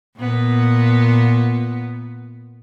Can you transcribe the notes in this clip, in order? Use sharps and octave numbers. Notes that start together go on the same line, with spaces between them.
A#2 B3